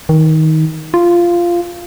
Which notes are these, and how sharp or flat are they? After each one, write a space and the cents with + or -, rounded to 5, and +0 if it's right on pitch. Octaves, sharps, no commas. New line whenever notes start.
D#3 +20
F4 -10